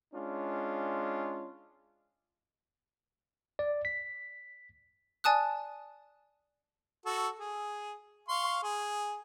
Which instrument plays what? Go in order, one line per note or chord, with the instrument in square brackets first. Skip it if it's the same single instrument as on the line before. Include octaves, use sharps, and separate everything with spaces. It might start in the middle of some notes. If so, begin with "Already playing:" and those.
[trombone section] G#3 C#4 D4 F4
[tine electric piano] D5
B6
[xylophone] D5 G#5 A5 D#6 F#6
[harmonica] F#4 A4
G#4
F5 C6 C#6
G#4